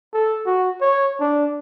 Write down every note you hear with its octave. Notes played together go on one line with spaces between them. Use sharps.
A4
F#4
C#5
D4